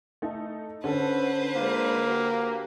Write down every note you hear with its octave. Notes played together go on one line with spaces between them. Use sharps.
A3 D#4 A4
D3 C#4 A4 B4 C5
G#3 A#3 D4 F4
F#4 G4